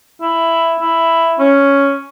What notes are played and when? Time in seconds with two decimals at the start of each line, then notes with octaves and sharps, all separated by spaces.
0.21 E4
0.80 E4
1.39 C#4